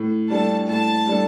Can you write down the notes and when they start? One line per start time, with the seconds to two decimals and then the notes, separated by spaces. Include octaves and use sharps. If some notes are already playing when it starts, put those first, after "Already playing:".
Already playing: A2
0.30 G3 D4 A4 A5
0.69 A2 A5
1.07 G3 D4 A4